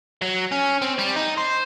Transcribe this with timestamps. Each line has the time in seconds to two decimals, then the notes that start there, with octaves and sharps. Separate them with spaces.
0.22 F#3
0.52 C#4
0.82 C4
0.99 G3
1.16 D#4
1.37 C5